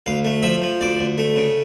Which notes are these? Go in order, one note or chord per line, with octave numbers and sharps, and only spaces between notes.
D2 F5
A3
F3 E5
F3
D2 D5
D2
A3
C#3